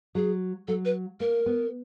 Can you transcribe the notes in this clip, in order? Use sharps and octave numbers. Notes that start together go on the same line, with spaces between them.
F#3 G#4
F#3 A4
B4
A#3 A#4
B3